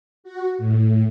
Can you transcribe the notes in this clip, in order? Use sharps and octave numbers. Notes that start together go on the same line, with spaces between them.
F#4
A2